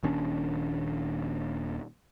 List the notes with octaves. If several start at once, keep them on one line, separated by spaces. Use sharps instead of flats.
D#1 D#2 C#4 D4